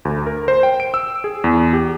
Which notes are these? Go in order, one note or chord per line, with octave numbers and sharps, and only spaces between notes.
D2
A#4
C5
G5
D7
E6
G#4
E2
G4